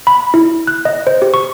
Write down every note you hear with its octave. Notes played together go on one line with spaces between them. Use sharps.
B5
E4
F#6
D#5
C5
G4
C#6